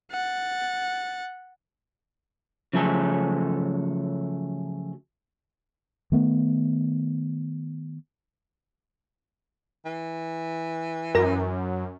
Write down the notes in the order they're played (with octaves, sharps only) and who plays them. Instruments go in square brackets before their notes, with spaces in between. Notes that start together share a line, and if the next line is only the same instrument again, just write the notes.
[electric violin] F#5 A6
[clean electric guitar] C#3 F3 F#3 A3 G#4 A4
[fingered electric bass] D#3 A3 B3
[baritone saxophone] E3
[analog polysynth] F#2 [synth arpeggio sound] A#4 A#5 A#6